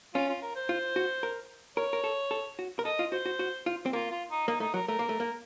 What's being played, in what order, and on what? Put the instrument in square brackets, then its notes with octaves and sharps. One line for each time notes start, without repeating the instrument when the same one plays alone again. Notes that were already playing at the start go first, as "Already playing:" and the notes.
[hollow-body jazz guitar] C#4 [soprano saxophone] F4
[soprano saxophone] F4
A#4
C5
[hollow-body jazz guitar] F4
F#4
A#4
[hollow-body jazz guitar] A#4 [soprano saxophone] C#5
[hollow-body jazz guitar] A#4
A4
A4
F#4
A#4
[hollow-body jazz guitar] A4 [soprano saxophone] D#5
[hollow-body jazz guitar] F4
[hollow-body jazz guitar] F#4 [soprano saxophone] C5
[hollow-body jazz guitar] F#4
F#4
F4
C4
[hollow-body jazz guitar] A#3 [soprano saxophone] F4
[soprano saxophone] F4
D#4
[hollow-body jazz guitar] A#3 [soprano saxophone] D#4
[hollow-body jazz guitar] A3 [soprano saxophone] D#4
[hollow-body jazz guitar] F#3 [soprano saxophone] A#4
[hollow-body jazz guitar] A3 [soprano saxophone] A#4
[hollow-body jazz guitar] A#3
A3
A#3